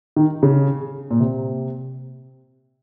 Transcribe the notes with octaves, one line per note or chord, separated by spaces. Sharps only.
D#3
C#3
A#2
C3